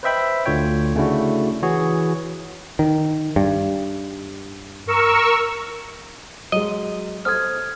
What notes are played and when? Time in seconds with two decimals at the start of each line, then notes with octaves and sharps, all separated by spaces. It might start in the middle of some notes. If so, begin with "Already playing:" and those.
0.03 B4 C5 D#5 E5 G5 B5
0.45 D2 D3 F4 C#5 G5
0.95 C#3 A3 C#4 D4 E4 F#4
1.62 E3 F#4 G#4 C#5
2.79 D#3
3.36 G2
4.87 A#4 C#6 E6
6.52 F#3 G#3 D#5
7.25 A4 C5 D#6 F6 G#6